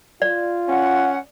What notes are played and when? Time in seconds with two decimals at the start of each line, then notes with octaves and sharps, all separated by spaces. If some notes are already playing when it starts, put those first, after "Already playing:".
0.22 F4 D5
0.68 C#4 F#5